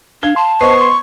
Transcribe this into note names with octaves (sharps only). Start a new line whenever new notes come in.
D4 F5 G#6 G7
A5 C6
B3 C5 D#5 C#6 C7
C6